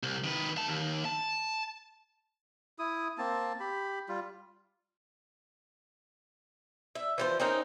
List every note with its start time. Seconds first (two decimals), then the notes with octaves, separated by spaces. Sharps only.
0.03 C2
0.24 D#3 B4
0.57 E5 A5
0.68 D#2
1.05 A5
2.79 E4 D#6
3.18 A#3 C4 A5
3.60 G4 B5
4.09 G3 F4
6.95 E5
7.18 E3 F3 C5
7.40 C4 C#4 D#4 A#4